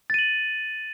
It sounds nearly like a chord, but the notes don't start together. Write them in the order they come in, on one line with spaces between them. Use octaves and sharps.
A6 D#7 F#7